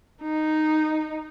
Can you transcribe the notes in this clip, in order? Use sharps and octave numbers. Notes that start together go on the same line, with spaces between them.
D#4